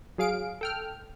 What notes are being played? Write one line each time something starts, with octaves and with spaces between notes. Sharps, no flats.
F#3 G#4 F5 D7
A4 G5 F6